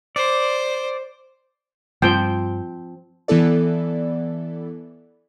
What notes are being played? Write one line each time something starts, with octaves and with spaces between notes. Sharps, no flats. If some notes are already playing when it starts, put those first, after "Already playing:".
C5 D5
G2 F3 G3 C4 G5
E3 B3 E4 A4 D5